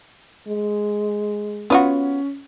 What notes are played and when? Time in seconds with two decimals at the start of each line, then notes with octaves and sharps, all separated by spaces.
0.48 G#3
1.70 B3 C#4 F4 F#4